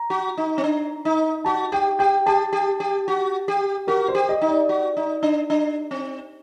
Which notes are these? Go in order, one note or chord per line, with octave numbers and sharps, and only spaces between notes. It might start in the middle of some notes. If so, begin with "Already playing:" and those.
Already playing: A#5
F#4
D#4
C4
D4
D#4
F#4 A5
G4 G5
G4 G5
G4 A5
G4
G4
F#4
G4
F#4 A#4
C5
G4
D#5
D#4
D5
F#4
D#4
D4
D4
C4